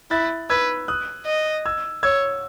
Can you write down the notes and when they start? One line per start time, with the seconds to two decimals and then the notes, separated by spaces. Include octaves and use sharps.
0.11 E4 F#6 A6
0.50 B4 E6 G#6
0.88 D#6 F#6
1.26 D#5
1.65 E6 G#6
2.03 C#5 E6 G#6